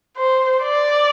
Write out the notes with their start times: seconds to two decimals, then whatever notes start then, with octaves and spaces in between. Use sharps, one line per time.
0.17 C5
0.63 D5